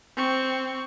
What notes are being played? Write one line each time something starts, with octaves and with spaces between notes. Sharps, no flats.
C4 C#6